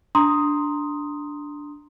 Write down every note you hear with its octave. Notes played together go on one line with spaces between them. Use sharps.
D4 A#5 C6 D#6